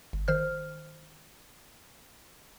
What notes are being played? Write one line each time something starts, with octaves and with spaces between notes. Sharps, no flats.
G1
D#3 C5 F6